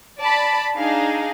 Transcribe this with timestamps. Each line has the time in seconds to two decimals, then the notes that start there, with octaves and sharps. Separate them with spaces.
0.19 D5 A5 B5
0.76 D4 D#4 G#4 F5